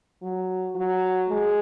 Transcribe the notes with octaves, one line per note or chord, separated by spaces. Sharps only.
F#3
F#3
G#3